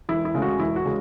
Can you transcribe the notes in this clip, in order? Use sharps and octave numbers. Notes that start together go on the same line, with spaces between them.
E1 E4
E4
D2 C#3 G#3 C#4
F#4
E1 E4
F#4
C#3 G#3